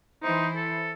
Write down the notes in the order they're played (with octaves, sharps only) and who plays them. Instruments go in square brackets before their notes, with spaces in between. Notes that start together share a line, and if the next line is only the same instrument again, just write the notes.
[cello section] E3 E4 C5 [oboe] D#4
[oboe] A4